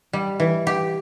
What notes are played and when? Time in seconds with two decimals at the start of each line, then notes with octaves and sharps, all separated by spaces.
0.13 G3
0.40 E3
0.67 G4